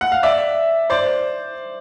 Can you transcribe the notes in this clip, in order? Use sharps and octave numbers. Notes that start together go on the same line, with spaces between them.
F#5
F5
D5 E5
C5 D5